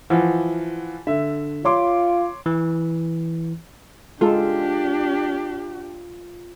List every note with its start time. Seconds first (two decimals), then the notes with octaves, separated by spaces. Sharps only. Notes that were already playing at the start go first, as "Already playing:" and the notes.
0.10 E3 F3 F#5
1.07 D3 E5
1.65 F4 C#5 C6 D6
2.46 E3
4.21 G#3 D4 F4 G4 A4